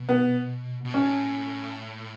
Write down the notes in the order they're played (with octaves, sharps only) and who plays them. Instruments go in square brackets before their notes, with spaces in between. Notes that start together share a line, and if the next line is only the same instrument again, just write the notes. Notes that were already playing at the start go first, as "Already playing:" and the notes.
Already playing: [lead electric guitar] B2
[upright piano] B3
[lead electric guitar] B2
[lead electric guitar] A2 [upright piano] C#4